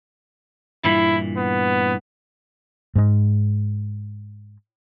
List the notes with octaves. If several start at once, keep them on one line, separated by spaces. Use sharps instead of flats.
G2 A#2 E3 E4
B3
G#2 G#3